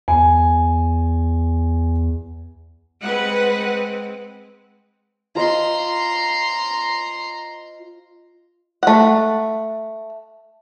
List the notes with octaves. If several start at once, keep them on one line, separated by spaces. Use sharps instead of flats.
E2 G#5
G#3 C4 B4 F#5
F4 C5 D#5 A#5 C6
A3 F#5